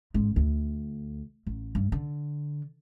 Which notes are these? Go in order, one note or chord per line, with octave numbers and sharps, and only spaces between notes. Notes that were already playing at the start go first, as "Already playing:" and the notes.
A1 G#2
D2
A1
G2
D3